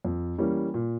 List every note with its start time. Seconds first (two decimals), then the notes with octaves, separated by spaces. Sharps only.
0.05 F2
0.38 E3 G3 A#3 C#4
0.74 A#2